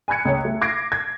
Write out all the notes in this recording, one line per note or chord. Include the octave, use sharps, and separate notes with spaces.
G#5 B5 F#6 G#6 C#7
C#2 C#5
A3
D6 G#6 A#6 C7 D7
G#6